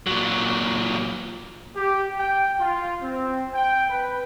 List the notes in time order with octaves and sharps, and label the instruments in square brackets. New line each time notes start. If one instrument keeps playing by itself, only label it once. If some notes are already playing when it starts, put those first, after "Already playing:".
[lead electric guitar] A#2 F#3
[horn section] G4
G5
F4
C4
G5
B4